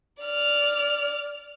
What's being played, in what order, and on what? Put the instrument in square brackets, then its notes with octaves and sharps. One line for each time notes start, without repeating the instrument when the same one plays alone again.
[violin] D5 F6